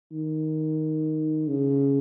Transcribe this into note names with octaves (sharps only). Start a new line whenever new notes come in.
D#3
C#3